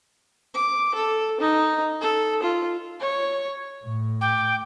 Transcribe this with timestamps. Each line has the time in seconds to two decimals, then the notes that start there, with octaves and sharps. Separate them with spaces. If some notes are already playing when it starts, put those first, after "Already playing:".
0.54 D6
0.94 A4
1.40 D#4
2.01 A4
2.43 F4
3.01 C#5
3.85 A2
4.21 G5 D6